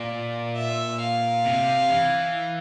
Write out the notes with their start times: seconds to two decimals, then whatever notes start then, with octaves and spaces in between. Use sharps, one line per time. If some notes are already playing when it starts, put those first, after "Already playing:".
Already playing: A#2 D5
0.57 E5
1.02 F5
1.46 C3
1.90 E3